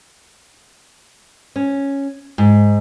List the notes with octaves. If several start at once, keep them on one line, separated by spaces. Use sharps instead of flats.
C#4
G#2